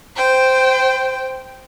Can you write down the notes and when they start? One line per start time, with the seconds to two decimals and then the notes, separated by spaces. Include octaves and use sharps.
0.16 C5 G5